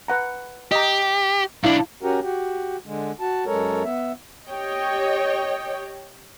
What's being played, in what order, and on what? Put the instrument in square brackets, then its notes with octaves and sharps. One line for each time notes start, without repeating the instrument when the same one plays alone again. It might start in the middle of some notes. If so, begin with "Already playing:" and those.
[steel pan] B4 F#5 A#5
[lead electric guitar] G4 [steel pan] D#5 A#5
[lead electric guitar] B1 D4 [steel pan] E4 F5
[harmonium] C#4 F#4 G4 A#4
F#4 G4
D3 G#3
F#4 A5
F#2 G#3 A4 A#4 C#5
B3 E5
[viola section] G4 C#5 D#5 G5